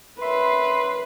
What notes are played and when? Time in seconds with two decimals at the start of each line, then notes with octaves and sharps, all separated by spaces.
0.21 F#2 B4 E5 C6